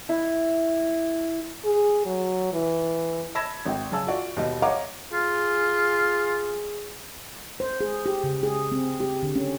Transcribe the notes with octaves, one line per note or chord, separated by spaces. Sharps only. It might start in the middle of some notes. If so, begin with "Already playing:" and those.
E4
G#4
F#3
E3
A5 B5 E6 G#6 A#6 E7
G#1 G5
F#2 C#3 G#5 A5 E6
F4 F#4 D5
D#2 B2 G3 D#5
C#5 D#5 F5 F#5 A#5 D6
F4 G#4
C5
G#4
G4
C#3
G#4
C4
G4
D3
C#4